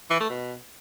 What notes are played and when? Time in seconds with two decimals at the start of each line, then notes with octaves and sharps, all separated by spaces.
0.10 E3
0.20 A3
0.30 B2